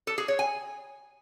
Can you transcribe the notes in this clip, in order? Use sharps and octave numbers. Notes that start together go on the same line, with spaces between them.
A4
G#4
C#5
G#5